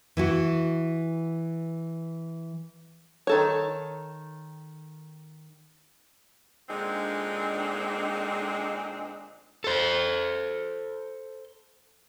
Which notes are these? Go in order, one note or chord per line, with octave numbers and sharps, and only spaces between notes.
E3 E4 F#4
D#3 A4 C#5
A#2 D3 G#3 C4 D4 D#4
A4 C5